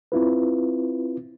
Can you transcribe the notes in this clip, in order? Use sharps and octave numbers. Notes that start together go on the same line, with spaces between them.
C4 E4 F4 B4